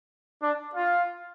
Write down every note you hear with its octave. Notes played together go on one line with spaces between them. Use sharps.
D4
F4